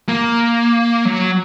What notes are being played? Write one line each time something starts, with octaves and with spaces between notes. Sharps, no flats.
A#3
F#3